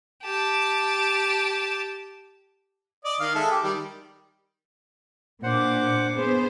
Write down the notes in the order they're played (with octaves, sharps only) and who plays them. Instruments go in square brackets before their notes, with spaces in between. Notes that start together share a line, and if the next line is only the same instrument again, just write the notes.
[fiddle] G4 A5
[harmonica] D5 D#5
D#3 F5
G#3 A4 E5
G4 D6
D#3 G3
[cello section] A#2 [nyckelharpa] D4 D6 [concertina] C5 F#5
[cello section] B3 C5 [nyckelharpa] G#4